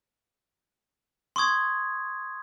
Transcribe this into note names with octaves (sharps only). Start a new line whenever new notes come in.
C6 C#6 D#6 G#6